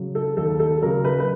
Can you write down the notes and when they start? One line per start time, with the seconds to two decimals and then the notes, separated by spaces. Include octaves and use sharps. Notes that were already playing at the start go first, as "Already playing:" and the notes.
Already playing: C#3 F#3
0.15 A4
0.37 D#2 A4
0.59 A4
0.81 C#3 F#3 A#4
1.05 B4
1.20 B4